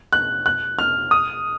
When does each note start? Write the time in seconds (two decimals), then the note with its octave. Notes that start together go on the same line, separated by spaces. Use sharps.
0.13 F#6
0.46 F#6
0.79 F6
1.11 D#6